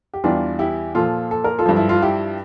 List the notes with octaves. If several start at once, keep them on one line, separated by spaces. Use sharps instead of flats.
G4
E2 E3 G3 D4 F4
E4 G4
A#2 F3 F4 A4
A4
A#4
F4 A4
G2 F3
E4
F4
E4 G4